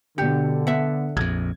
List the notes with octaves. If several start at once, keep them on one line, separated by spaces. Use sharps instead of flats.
B2 D3 G4 C#7
B3 E5 F#5
A#1 F2 G#6